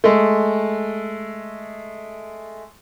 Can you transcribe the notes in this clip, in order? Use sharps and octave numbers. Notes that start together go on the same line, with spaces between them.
G#3 A3